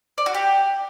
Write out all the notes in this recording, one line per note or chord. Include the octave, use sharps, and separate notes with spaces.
D5
F#4
G4